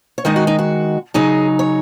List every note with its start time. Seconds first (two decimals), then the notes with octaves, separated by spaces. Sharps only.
0.18 C#5
0.25 D#3 G#3 D#4 D#5
0.36 F#4
0.47 D#4
0.59 F#4
1.14 C#3 F#3 D#4 G#4
1.59 C#5